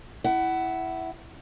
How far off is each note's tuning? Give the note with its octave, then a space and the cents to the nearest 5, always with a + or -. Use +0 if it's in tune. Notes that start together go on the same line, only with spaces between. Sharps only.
E4 +0 F#5 +20